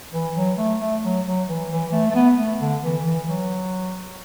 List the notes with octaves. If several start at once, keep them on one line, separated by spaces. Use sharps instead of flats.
E3
F#3
A3
A3
F#3
F#3
E3
E3
A3
A3
B3
A3
D3
E3
E3
F#3